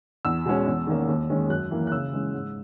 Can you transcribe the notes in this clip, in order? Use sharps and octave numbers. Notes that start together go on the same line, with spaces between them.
E2 E6
B2 G#3 C#4
E2
D#3 A#3 C#4
D#2
D#3 G#3 C#4
F#2 F#6
E3 A#3
F#6
C#3 E6
E3 G#3 C#4
G#2